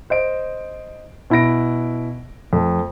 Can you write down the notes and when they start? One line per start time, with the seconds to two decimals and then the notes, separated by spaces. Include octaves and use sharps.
0.10 C5 D#5 D7
1.30 B2 E4 B5 A#6 D7
2.53 F2 A3